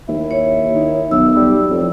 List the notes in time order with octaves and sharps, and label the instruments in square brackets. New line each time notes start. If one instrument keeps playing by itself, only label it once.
[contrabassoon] D#2 [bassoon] E4
[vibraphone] C#5
[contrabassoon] D#3
[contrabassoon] B1 [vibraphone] E6
[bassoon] G3
[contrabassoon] F2 [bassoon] A2